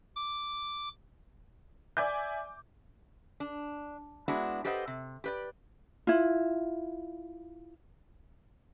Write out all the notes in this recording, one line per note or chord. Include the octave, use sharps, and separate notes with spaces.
D6
D5 E5 G#5 D6 G6
D4
G#3 B3 D4 E4 F#4
G4 A4 B4 C5 D#5 F#5
C3
G4 B4 D5
E4 F4